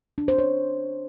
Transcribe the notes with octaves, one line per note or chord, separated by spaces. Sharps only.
D4
C5
C#5